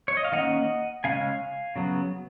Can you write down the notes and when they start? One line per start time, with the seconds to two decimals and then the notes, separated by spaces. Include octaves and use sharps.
0.08 C#5
0.17 D#5
0.24 F5
0.32 D#3 A#3 C#4 D#5 F#5
1.04 C#3 G#3 C#4 F5 G#5
1.76 C#3 F#3 B3